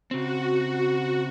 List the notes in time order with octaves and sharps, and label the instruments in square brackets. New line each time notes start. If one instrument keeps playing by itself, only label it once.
[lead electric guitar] C#3 C4 [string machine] F#4